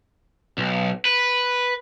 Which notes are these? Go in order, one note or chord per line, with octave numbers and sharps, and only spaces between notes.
B1
B4